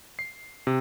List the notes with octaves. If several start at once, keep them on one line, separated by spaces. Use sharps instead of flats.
C7
C3